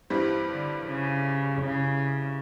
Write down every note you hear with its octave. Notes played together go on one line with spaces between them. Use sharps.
G2 E3 G3 C4
D3
C#3
C#3